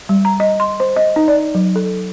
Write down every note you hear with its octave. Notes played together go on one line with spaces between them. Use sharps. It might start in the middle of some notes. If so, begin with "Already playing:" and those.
G3
A#5
D#5
C6
C5
D#5
D#4
D5
F#3
A4